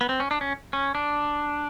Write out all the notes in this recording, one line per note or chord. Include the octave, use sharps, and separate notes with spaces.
B3
C4
C#4
D4
C#4
C#4
D4